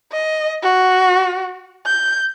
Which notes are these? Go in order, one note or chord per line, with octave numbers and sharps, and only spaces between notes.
D#5
F#4
G6